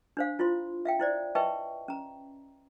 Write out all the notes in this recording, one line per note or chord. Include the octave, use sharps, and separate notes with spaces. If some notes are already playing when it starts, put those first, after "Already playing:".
D4 C5 F5
E4 F4 C5 C6
E5 F5 G5
E4 C5 D5
B4 D#5 E5 G5 A5 C#6
C#4 A#5